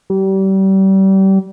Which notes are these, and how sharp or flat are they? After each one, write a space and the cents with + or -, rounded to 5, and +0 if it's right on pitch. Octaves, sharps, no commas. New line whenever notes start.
G3 -30